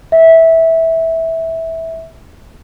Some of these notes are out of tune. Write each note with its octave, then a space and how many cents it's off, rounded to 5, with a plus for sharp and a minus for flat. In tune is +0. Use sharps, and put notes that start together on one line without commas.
E5 -15